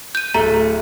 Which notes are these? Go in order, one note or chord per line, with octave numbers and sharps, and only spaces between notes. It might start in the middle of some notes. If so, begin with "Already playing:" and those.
G6 D#7
D1 A3 A#5